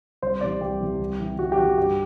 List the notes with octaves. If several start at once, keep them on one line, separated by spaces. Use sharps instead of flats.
C2 C5
C3 E3 D5
C2 G4
C3 E3
C2
C3 E3
C2 F#4
G4
C3 E3 F#4
G2 G4